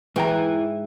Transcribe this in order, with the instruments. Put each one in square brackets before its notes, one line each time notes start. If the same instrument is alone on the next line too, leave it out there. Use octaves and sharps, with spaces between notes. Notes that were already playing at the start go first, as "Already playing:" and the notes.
[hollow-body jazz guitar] G#2 G5 A#5 [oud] E3